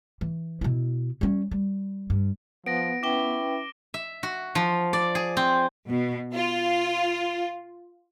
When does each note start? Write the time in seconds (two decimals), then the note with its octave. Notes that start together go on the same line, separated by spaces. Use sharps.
0.21 E3
0.61 B2 E4
1.21 G3 C#4
1.51 G3
2.10 G2
2.66 F3 B3 A#6 D7
3.03 C#4 E4 B4 G5 D6 G7
3.94 E5
4.23 F#4
4.55 F3
4.93 D5
5.15 G#4
5.37 C4
5.88 B2
6.33 F4